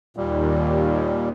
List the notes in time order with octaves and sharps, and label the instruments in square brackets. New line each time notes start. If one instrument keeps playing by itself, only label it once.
[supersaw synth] D#2 [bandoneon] A#2 G3